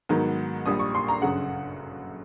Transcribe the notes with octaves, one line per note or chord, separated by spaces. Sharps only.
G#2 D#3 F#3 B3
A#1 A#2 G3 D#6
C#6
C6
A#5
G1 F#2 C#3 F#5